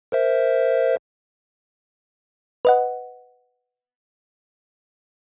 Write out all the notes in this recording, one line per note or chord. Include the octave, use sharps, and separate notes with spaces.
A#4 C5 E5
B4 D#5 F#5